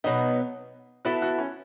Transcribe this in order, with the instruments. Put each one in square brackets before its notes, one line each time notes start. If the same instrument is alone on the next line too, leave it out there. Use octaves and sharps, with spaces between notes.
[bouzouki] B2 F#3 B3 [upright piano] D#4
[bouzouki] B3 E4 A4 E5 [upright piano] F#4
[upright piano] F#4
C#4